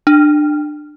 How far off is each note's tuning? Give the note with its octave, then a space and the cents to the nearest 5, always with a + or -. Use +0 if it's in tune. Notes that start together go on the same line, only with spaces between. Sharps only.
D4 +25